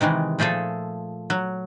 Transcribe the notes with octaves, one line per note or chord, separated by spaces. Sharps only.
C3 D#3 E3 G#3
A#2 F3 A3 G#4 A4
F#3